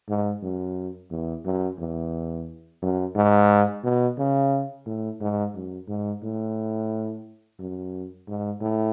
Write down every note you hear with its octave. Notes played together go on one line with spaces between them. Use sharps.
G#2
F#2
E2
F#2
E2
F#2
G#2
B2
C#3
A2
G#2
F#2
G#2
A2
F#2
G#2
A2